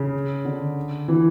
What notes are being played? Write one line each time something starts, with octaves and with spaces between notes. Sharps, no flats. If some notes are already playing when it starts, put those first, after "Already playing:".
Already playing: C#3
D3
E3